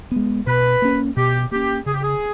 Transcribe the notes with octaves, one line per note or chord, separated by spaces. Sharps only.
G#3 B3
B2 B4
A#3 C#4
B2 G4
A#3 C#4 G4
C#3 G#4
G4
G#4